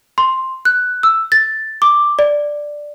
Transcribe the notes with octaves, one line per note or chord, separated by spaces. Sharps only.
C6
F#6
E6
A6
D6
D5